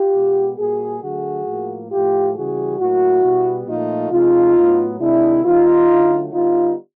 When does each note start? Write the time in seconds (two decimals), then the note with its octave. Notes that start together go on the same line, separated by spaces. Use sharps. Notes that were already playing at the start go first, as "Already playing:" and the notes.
Already playing: F4 G4
0.14 B2 G#3 B3
0.58 A#2 G3 A#3 F#4 G#4
1.02 D3 F#3 A3 F#4 G#4
1.46 A2 F3 A#3
1.91 A2 F3 A3 F4 G4
2.35 C#3 E3 G3 F#4 G#4
2.79 A2 F#3 A#3 E4 F#4
3.23 B2 G3 B3
3.67 A#2 F3 A3 D#4 F4
4.11 C3 F3 G#3 D#4 F4
4.56 A2 F#3 B3
5.00 C3 D#3 G#3 D4 E4
5.44 D#3 G3 B3 D#4 F4
5.88 D3 F#3 A3
6.33 D3 G3 B3 D#4 F4